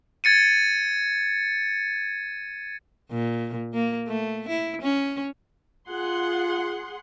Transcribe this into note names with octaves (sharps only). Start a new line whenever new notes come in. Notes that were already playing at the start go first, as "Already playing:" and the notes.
G#6 A6 C#7 D#7
A#2
A#3
A3
E4
C#4
F4 G#4 F#5 C6